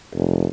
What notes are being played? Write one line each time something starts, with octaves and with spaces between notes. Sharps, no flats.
F1